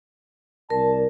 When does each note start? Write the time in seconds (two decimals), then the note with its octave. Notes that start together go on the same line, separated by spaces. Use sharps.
0.70 C2 A#4 D5 A5